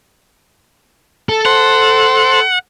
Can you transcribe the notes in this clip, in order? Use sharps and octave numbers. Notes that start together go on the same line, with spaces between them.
A4
C5 F#5